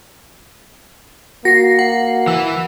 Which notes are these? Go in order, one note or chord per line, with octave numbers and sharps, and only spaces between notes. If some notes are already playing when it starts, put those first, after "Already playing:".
A#3 F#4 A#6 C7
F#5
E3 E6